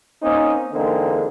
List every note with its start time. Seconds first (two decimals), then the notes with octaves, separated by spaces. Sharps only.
0.23 A#3 C4 C#4 D#4
0.73 E2 D3 G#3 A#3 C4 D#4